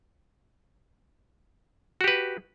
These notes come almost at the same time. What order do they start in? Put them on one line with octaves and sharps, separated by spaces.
F#4 G4 B4